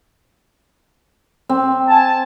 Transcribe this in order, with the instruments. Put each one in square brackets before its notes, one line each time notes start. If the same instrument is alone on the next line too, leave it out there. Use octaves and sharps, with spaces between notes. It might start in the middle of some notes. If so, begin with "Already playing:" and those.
[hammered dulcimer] C4
[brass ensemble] G#5 A5